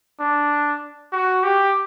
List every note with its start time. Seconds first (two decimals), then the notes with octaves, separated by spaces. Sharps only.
0.20 D4
1.13 F#4
1.44 G4